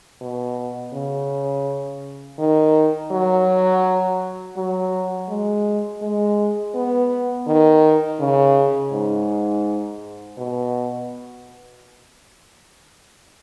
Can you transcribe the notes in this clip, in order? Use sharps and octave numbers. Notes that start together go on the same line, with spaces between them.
B2
C#3
D#3
F#3
F#3
G#3
G#3
B3
D#3
C#3
G#2
B2